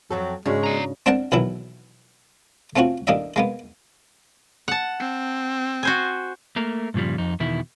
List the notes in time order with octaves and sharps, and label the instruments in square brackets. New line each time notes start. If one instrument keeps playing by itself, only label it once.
[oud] F2 C4 A4 [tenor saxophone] F#3
[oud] G#2 D4 F#4 [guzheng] C#3 [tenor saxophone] G#3
[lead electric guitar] D5 A#5
[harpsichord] C4 D4 A#4 F#5 G5 A5
B1 D#3 E3 F#3 E4
A3 C4 C#4 F4 F#4
A1 A#3 D4 D#5 E5
G#3 A#3 B3
[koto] F#5 A5
[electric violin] C4
[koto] F#4 C5 G#5
[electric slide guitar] A3 A#3 A#4
G2 A#2 C#3 F3 G3
F2 D#4
E2 B2 D#3 E4